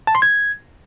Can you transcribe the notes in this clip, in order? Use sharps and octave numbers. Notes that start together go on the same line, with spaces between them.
A5
C6
G#6